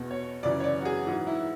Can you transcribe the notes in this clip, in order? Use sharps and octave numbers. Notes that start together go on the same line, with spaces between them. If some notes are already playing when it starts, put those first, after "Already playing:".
Already playing: E2 B2
C#5
F#2 C#3 E3 D5
C#5
D5
F#4
G#4
G#2 E3 F#4
E4